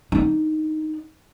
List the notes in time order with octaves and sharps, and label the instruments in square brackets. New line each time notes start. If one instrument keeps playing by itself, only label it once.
[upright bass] D4 D#4